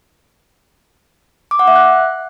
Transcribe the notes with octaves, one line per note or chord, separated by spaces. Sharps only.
D6
F#5
E5
F#6